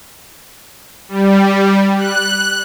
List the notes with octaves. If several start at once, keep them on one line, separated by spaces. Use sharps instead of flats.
G3
F#6